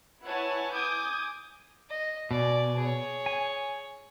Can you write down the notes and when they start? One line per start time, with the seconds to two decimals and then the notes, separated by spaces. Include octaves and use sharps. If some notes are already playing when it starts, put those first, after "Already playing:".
0.24 E4 B4 C#5 F#5 G#5 A5
0.73 G#5 D6 D#6 G6
1.90 D#5
2.31 B2 D5 G#5
2.79 G#4 C#5
3.26 G#5